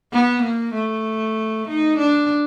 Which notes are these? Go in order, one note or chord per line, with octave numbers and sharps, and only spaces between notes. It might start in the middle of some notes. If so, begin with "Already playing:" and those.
B3
A#3
A3
D#4
D4